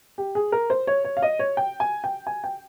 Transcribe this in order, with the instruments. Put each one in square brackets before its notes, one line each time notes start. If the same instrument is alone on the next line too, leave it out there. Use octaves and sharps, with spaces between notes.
[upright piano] G4
G#4
A#4
C5
C#5
C#5
F5
D#5
C#5
G5
G#5
G5
G#5
G5